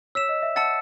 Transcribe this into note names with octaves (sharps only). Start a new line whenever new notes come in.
C#5 E6 B6 E7
D#5
E5
F#5 A5 E6 A6 C#7